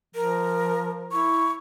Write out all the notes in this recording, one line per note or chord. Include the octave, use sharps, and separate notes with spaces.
F3 A#4
E4 C#6